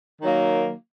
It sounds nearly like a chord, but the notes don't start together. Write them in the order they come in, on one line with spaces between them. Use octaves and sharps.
D#3 F#3 A#3